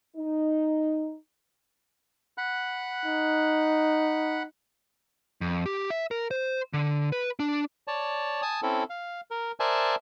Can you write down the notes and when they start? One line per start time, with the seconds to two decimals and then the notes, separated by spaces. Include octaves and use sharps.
0.17 D#4
2.38 F#5 B5 F#6
3.05 D#4
5.41 F2
5.66 G4
5.90 E5
6.11 A#4
6.31 C5
6.74 D3
7.12 B4
7.39 D4
7.88 C#5 D5 A5
8.42 G#5 A5 D#6
8.62 C4 C#4 E4 A4
8.90 F5
9.31 A#4
9.60 A#4 C5 D5 E5 G#5 A5